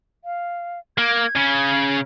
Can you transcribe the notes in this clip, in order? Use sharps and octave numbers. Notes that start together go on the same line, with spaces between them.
F5
A#3 G#6
C#3